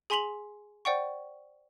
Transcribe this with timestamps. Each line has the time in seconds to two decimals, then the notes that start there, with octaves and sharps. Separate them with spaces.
0.10 G#4 G#5 C6 B6 F7 F#7
0.85 C5 D5 F#5 G5 C#6